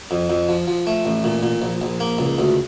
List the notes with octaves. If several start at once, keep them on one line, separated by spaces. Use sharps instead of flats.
F2
F2
F3
F3
A3
A1
A#2
A#2
A#1
A#1
A#3
C#2
D2